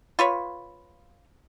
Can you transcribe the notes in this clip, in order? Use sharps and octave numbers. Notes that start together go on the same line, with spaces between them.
F4 B4 C#5